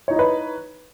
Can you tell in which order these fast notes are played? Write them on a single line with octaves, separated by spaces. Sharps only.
C#5 D#4 E4 D#5 B4